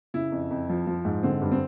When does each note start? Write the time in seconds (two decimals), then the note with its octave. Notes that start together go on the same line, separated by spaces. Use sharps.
0.14 C#3 E4
0.32 F2
0.51 F2
0.69 F3
0.87 F3
1.05 G#2
1.23 D3 C4
1.42 G2
1.52 C4